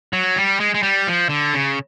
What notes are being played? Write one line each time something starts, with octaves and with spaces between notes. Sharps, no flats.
F#3
G3
G#3
G#3
G3
F3
D3
C#3